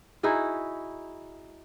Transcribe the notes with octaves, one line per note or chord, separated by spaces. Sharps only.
D#4 E4 F#4 G#4